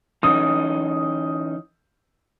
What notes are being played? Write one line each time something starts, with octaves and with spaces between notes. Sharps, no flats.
E3 C#4 D#4 D#6